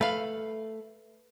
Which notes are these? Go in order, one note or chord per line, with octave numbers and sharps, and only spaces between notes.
A3 B4 F5